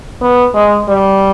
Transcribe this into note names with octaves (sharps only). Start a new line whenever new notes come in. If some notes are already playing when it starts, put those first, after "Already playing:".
B3
G#3
G3